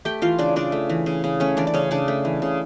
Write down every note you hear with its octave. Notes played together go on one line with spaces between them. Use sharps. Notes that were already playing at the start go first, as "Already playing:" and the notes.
A3 G4 G5
E3 F4 F5
C#3 D4 D5
C#3 D4 D5
A3
E3
C#3
C#3
A3 C#4 C#5
E3 D4 D5
D5
C#3 C#4 C#5
C#3 D4 D5
A3
E3
C#3